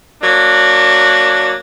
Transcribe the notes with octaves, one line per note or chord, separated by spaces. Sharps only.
F#3 A#3 D4